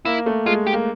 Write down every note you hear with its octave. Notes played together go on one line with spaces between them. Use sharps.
A#3 E4
A3
G#3 F4
G4
A#3